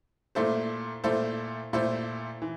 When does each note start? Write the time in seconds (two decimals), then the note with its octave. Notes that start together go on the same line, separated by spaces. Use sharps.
0.35 A#2 A3 E4 A4 C5
1.04 A#2 A3 E4 A4 C5
1.73 A#2 A3 E4 A4 C5
2.42 E3